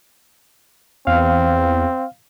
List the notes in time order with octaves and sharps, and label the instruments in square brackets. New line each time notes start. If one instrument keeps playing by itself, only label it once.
[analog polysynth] E2 [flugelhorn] C4 [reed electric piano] F5